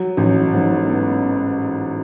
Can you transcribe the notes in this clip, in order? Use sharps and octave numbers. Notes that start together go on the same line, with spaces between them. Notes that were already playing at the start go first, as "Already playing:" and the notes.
Already playing: F#3
A1
G#2
B3